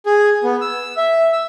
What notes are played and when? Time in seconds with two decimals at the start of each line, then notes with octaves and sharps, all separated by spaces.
0.06 G#4
0.44 B3
0.61 E6
0.97 E5
1.32 E6